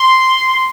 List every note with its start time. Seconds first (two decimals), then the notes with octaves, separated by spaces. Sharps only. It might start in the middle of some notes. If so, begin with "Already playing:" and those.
Already playing: C6